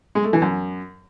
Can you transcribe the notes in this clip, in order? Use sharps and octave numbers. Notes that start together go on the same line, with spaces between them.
G#3
A3
E3
F#2